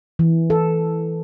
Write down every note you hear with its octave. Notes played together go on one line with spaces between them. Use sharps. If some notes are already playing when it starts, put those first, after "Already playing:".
E3
A4